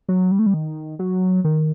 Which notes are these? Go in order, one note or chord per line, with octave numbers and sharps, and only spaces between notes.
F#3
G3
A3
G3
D#3
F#3
D#3